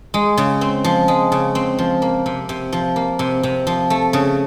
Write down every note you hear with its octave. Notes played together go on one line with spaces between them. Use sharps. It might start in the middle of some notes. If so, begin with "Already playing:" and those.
G#3
C#3
C4
F3
G#3
C#3
C4
F3
A#3
C3
C3
F3
A#3
C3
C3
F3
A3
C#3